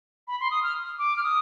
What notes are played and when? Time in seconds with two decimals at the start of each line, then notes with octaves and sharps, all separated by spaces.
0.28 B5
0.40 C6
0.51 D#6
0.63 F6
0.99 D6
1.17 F6
1.23 D#6